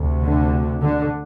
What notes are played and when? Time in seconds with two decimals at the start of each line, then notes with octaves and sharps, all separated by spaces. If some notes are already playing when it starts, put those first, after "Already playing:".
Already playing: D2 C3
0.22 D3
0.81 D3